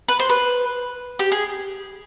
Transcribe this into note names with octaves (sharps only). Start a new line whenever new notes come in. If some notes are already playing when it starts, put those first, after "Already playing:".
B4
C5
B4
G4
G#4